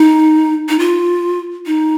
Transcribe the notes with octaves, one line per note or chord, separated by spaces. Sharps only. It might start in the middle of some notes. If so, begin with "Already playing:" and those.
Already playing: D#4
D#4
F4
D#4